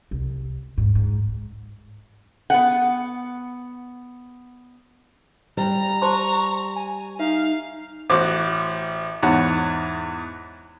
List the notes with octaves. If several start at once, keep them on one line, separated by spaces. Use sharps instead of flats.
C2
G#2
G#2
B3 F#5
G3 C5 A#5
C5 A5 C6 C#6
G#5
D#4 E5 F5
A1 F#4 C5 D6
E2 G#2 C#5 F#5